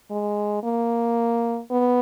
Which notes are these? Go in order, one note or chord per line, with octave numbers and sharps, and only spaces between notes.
G#3
A#3
B3